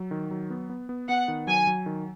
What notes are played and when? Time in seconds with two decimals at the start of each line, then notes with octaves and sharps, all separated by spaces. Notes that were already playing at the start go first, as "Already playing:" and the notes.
Already playing: F#3
0.11 D#3
0.31 F#3
0.50 B3
0.70 B3
0.89 B3
1.08 B3 F#5
1.28 D#3
1.47 F#3 G#5
1.67 F#3
1.86 D#3